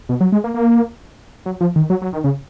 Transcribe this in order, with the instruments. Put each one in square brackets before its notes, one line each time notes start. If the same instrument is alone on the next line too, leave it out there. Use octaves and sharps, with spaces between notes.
[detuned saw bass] B2
F#3
G#3
A#3
A#3
F#3
F3
D#3
F#3
F#3
D#3
C#3